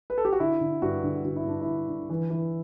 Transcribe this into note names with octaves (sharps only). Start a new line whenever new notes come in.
B4
A4
G4
F#4
D3 E4
D3
G2 F#4
D3
D3 F#4
E4
G2 D4
E4
D3
D3
E3
E3